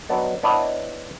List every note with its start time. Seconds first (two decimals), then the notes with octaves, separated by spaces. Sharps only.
0.09 F#3 B3 D4 D#4
0.43 B3 D4 E4 C#5 D#5